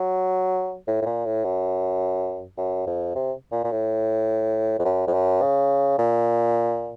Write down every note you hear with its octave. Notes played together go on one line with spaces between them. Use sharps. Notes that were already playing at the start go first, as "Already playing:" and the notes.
Already playing: F#3
A2
A2
A#2
A2
F#2
F#2
F2
C3
A#2
A#2
A2
F2
F#2
F2
F#2
C#3
A#2